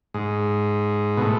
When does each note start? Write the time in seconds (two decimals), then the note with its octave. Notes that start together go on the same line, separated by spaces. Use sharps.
0.14 G#2
1.17 B2
1.22 A2